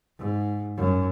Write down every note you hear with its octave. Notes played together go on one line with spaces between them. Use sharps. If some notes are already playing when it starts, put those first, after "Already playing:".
G#2
F#2